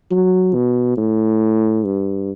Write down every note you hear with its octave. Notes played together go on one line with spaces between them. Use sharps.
F#3
B2
A2
G2